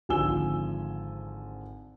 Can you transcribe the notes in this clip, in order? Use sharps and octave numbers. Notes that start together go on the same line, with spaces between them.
G#1 D3 F3 G#5 E6 G7